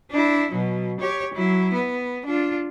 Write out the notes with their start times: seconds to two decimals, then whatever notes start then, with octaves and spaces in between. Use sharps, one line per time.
0.11 D4 E4
0.51 B2 F#3
1.00 G4 C#5
1.34 F#3 E4
1.74 B3
2.26 D4 F4